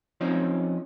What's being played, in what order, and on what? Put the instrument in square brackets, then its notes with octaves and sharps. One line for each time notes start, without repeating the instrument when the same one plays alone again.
[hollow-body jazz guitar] F3 C4 C#4 D#4